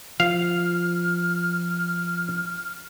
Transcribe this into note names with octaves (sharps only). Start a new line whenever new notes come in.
F3 F5 F6